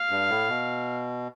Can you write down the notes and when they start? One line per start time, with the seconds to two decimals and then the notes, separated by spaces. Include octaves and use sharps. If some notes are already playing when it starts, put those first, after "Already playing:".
Already playing: F5
0.10 G2
0.29 A2
0.49 B2